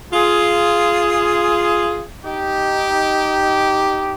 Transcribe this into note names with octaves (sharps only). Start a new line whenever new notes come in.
F4 G#4
D#4 G4